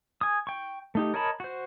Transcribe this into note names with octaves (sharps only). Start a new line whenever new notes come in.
G#5 D#6
G5 C#6
A3 D#4 G4
A#4 C#5 D#5 A5 B5
F#4 C5